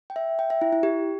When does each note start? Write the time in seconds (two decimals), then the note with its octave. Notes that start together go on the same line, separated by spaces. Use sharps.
0.10 G5
0.16 E5
0.39 G5
0.50 E5
0.61 E4
0.72 E4
0.83 G4